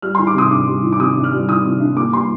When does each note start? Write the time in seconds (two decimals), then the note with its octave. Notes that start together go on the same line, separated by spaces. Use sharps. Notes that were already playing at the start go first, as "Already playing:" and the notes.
0.02 G3 F6
0.15 C6
0.19 D#3
0.27 D6
0.34 C3 D#6
0.51 D4 D6
0.67 G3
0.83 D#3
0.93 D6
0.99 C3 D#6
1.16 D4
1.24 F6
1.32 G3
1.48 D#3 D#6
1.65 C3
1.80 D4
1.96 A#3 D6
2.13 G3 C6